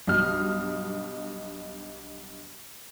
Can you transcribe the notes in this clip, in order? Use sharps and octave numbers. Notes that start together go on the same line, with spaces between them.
B1 G2 D#5 F6